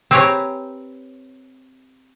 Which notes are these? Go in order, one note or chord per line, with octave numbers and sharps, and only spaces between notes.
C4 G4 B4 C#5 G#5 A#5